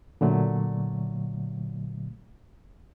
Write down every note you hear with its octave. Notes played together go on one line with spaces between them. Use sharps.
A#2 D3 F#3 A3